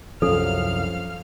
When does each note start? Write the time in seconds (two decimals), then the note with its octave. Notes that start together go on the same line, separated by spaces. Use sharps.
0.22 C2 F#2 F3 C#4 A4 F5 F6